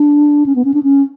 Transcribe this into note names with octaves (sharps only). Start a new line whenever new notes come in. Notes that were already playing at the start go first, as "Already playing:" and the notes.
Already playing: D4
C#4
B3
C#4
D4
C#4